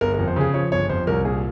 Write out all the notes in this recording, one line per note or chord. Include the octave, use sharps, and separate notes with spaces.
G1 A#4
A#4
F2
C5
C#3 G#4
F3 C#5
G1 C#5
F2 C5
C2 A#4
A#2 G#4